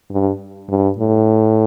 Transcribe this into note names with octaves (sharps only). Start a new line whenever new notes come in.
G2
G2
A2